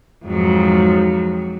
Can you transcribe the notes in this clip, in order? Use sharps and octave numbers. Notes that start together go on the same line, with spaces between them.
F2 G#2 F#3